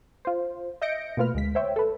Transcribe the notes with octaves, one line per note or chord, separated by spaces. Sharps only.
F4 C5
D#5 E5 G6 A#6 C#7 D7
B2 A3 A#3 F4 B4 F6
D2 G#3 B6
C5 C#5 E5 G5
A4 B4